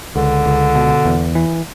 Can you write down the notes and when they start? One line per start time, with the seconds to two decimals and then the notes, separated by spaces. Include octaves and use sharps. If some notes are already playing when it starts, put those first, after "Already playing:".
0.15 C#2 D3
0.46 C#2
0.75 B2
1.05 E2
1.35 E3